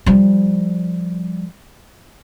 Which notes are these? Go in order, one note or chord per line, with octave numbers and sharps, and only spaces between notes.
F3 G3